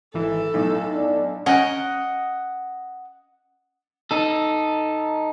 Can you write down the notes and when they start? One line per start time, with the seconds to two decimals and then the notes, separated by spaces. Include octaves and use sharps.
0.14 G#1 E3 A4
0.54 B1 A2
0.94 D4
1.46 C#4 A#4 D#5 F#5 G5
4.11 D#4 A4